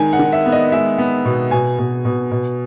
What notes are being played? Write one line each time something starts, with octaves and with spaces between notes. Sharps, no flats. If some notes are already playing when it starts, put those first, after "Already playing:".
Already playing: D#3 G#3 G#5
F#5
D#3
E5
B3
D#5
G#3 E5
B3
B2
B2 G#5
B2
B2
B2